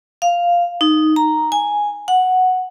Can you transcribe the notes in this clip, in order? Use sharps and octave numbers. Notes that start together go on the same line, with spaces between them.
F5
D#4
A#5
G#5
F#5